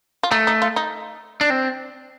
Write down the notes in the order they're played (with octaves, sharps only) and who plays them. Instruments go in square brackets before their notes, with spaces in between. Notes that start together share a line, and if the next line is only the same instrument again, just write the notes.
[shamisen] F4
[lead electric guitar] A3 [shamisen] D#4
[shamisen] D#4
F4
D#4
[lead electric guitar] D4
C4